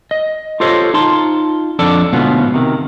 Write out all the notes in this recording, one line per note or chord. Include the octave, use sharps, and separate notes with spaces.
D#5
F4 G4 A4 C5 C#5 D#5
D#4 F4 A5 C6
F2 D4 A4 D5 A5
D2 G#2 B2 B3 C#4 F4
C3 D#3